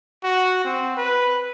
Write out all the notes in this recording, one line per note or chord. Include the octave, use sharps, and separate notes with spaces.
F#4
C4
B4